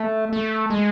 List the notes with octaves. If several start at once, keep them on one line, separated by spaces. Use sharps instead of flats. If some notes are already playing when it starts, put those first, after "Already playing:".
Already playing: A3
A3
G#3